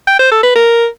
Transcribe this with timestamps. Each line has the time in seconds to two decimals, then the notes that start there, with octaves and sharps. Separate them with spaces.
0.07 G5
0.19 C5
0.31 A4
0.43 B4
0.55 A#4